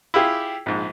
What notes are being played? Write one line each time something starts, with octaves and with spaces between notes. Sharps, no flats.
E4 F4 G4 G#4
A#1 G#2